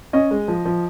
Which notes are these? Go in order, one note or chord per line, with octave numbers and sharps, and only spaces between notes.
C#4 D#5
G#3
F3
F3